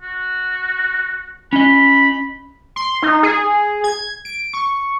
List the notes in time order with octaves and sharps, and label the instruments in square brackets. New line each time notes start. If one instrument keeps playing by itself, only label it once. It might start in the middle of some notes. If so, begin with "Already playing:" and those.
[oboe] F#4
[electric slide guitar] C#4 D#5 [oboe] B5
[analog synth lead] C6
D#4
G#4
G#6
D7
C#6